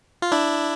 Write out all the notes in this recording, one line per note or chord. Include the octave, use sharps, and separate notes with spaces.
F4
D4 E4